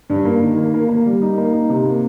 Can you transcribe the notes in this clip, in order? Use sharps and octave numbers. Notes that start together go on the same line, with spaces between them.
G2
A#3
D#3
A#3
A#3
A#3
G3
D#4
A#3
D#4
C3
A#3